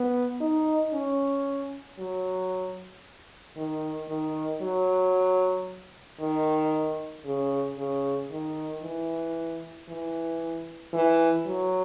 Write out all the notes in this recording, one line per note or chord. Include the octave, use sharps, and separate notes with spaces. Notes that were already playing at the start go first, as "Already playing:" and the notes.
Already playing: B3
D#4
C#4
F#3
D#3
D#3
F#3
D#3
C#3
C#3
D#3
E3
E3
E3
F#3